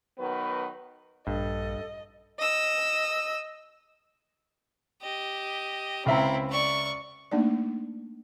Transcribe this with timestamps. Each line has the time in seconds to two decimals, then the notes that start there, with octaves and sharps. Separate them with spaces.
0.18 D#3 F#3 B3 B4
1.27 A#1 G2 A4 D#5
2.38 D#5 E6
5.02 G4 D#5
6.06 C#2 C4 E4 E5 A#5
6.50 D5 C#6
7.32 A3 A#3 D4 D#4 D5